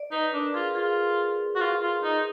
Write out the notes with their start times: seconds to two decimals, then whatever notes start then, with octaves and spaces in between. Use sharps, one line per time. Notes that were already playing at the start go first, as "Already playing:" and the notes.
Already playing: D5
0.12 D#4 B4
0.33 D4 A#4
0.54 F4 G#4
0.75 F4 G#4
1.56 F#4
1.61 F4
1.82 F4
2.03 D#4